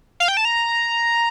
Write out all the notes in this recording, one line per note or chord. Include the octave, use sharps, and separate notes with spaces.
F5
G5
A5
A#5